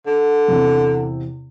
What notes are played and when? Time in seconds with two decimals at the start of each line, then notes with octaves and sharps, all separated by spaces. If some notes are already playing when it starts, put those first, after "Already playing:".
0.06 D3
0.48 E2 C3